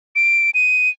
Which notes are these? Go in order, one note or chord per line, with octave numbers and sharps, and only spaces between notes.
D7
D#7